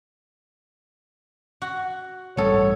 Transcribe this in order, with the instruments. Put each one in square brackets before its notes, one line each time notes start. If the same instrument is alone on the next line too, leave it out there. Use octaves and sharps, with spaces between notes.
[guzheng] F#4
[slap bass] A1 G2 G3 [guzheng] B3 A4 [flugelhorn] C#5